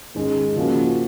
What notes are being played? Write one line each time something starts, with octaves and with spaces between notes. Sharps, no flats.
G#2 D#3 G#3 C#4
C#3 F3 A#3 C#4 F#4